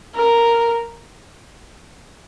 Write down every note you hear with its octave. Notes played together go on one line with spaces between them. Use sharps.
A#4